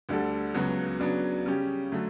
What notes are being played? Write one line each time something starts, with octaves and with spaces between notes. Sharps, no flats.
D2 D3 G3 D4 A4
C#2 C#3 F#3 B3 F#4
C#3 F#3 B3 D4
C#3 G3 C#4 G4
D3 F#3 A3